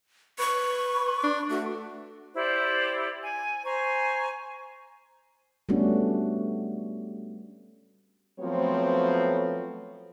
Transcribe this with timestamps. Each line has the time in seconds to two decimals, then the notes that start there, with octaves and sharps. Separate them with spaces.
0.39 B4 C#6
1.07 B4
1.23 D4
1.50 A3 F#4
2.34 E4 G4 C5 D5
3.22 G#5
3.64 C5 G#5 A#5 C#6
5.69 G3 A3 B3 C#4 D4 F#4
8.40 F3 F#3 A3 B3 C4 C#5